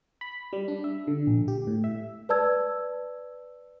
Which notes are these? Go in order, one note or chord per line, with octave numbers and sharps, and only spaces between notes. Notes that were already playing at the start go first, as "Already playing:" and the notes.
B5
G3
D4
E5
D3
A#1
G4
A2
E5
B4 D5 A5 E6 G#6